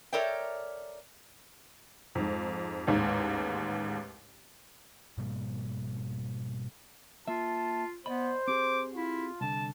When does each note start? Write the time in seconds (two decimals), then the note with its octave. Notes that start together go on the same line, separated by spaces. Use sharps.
0.13 A4 A#4 C#5 D5 E5 G5
2.15 F2 G#2
2.87 A1 D#2 G#2
5.18 G#2 B2 G3 A#3
7.28 A#3 F4 E5 A5
8.06 B3 C5 D5 D#5 B5
8.48 C4 G4 G#4 D6
8.95 E4 F4
9.41 C2 D3 A5